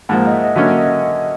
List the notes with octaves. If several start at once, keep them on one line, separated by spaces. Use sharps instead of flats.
G#2 F3 A#3 F#5
F5
D#5
E5
D#5
D3 F#3 A#3 C#4 E5
D#5